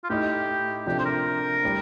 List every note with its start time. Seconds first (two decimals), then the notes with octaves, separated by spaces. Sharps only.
0.04 F4
0.09 A2 A3 D#4 G4
0.86 C3 F3 A3 D4 G4
0.99 C5
1.05 A#4
1.63 A2 G3